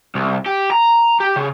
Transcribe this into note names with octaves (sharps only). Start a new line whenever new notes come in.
C2
G4
A#5
G4
C#3